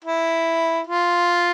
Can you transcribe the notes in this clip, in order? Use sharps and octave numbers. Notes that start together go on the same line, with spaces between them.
E4
F4